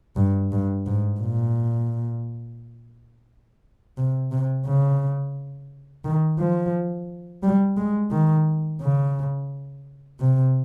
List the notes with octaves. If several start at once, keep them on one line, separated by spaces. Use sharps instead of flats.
G2
G2
G#2
A#2
C3
C3
C#3
D#3
F3
G3
G#3
D#3
C#3
C3